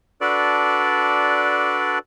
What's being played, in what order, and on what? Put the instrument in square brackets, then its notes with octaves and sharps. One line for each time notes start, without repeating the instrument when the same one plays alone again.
[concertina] D4 F#4 A4 B4 D5